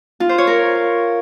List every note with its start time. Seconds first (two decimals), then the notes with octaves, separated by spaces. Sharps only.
0.20 F4
0.29 C5
0.38 C#5
0.47 A#4